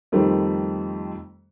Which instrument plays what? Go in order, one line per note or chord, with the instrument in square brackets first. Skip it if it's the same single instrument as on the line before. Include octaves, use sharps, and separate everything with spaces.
[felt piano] F2 D#3 G3 A3 C4